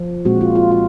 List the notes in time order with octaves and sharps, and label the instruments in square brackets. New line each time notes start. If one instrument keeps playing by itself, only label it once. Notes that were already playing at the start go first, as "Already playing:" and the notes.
Already playing: [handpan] F3
A#2 G#3 C4 F#4
F4
F4
F4